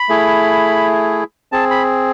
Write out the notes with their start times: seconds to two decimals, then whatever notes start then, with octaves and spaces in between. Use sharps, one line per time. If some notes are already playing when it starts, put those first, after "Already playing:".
Already playing: B5
0.09 A3 E4 G#4
1.52 C4 G#4 A5
1.70 B5